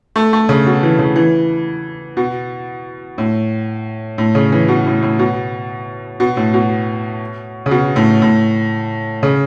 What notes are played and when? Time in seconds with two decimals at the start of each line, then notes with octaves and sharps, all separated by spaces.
0.16 A3
0.33 A3
0.49 C#3
0.66 B2
0.83 E3
0.99 C#3
1.16 E3
2.17 B2
3.18 A2
4.18 A2
4.35 C#3
4.52 E3
4.68 B2
4.86 A2
5.02 A2
5.19 B2
6.20 B2
6.37 A2
6.54 B2
7.66 C#3
7.71 B2
7.96 A2
8.22 A2
9.23 C#3